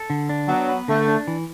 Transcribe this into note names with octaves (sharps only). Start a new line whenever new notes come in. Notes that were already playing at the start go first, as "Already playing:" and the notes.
Already playing: A4
D3
D4
F#3 B3
B4
D3 A3
D4
E3